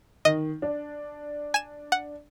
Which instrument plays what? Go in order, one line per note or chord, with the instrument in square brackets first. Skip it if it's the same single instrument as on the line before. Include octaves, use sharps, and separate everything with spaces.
[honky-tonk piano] D#3 [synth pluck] D#5
[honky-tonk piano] D4
[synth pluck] G#5 E7
F#5